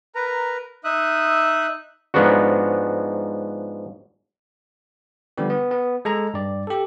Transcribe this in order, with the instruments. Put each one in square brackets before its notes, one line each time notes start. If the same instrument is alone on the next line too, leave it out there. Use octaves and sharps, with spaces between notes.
[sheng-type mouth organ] A#4 B4 A#5
D#4 E5 D#6 F#6
[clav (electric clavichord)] G#2 F3 B3 D4 F#4
[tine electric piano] D3 F3 G3 B3 G4
B3
B3
G#3 A4 A#5
G2 D5
G4 A4